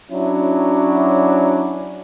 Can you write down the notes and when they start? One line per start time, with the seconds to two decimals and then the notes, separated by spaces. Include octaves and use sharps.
0.10 F#3 C#4 D4 E4